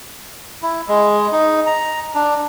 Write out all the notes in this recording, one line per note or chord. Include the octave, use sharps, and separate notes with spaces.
E4
G#3
D#4
A#5
D4